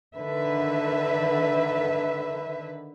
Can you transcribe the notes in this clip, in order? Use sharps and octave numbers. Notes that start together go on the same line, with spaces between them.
D3 D#3 B4 E5